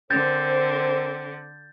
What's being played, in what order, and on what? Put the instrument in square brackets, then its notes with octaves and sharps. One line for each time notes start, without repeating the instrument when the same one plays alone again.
[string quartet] D3 [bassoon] C4 [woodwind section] A#4 C5 [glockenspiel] G6 A6